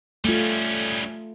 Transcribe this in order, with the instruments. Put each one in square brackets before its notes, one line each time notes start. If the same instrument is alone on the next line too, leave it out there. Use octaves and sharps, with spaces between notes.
[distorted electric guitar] G3 C#4 [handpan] A3 F4